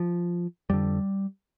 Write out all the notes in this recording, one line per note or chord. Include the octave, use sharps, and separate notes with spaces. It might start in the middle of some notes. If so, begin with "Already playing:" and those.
Already playing: F3
F2 D3 G3